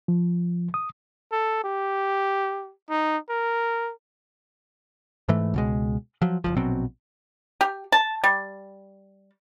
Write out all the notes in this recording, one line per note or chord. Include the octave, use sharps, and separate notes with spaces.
F3
D#6
A4
G4
D#4
A#4
G#2 E3 A3
C#2 B2 G#3
F3 F#3
F#1 C#2 F3
A#1 B2 F#3 C4
G4
A5
G3